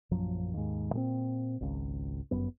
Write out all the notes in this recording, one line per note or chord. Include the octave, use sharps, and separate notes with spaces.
A#1 F#2 F3 F#3
D#2 G#2
A#2 G#3 C4
G#1 C#2
G1 F#2 B3